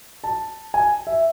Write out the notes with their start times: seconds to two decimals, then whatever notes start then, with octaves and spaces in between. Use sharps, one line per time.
0.24 A5
0.74 G#5
1.07 E5